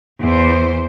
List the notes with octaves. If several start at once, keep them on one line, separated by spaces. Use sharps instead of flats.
E2 C5